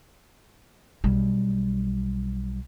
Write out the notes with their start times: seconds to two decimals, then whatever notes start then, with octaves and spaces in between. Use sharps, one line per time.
1.04 B1 G3